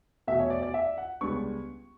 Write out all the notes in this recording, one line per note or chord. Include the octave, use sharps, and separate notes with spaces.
E2 B2 A3 E5
C#5
D5
D5
E5
F#5
C#2 C#3 G3 B3 D4 C#6